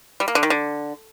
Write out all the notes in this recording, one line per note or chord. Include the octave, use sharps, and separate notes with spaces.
G3
A#3
D3
D#3
D3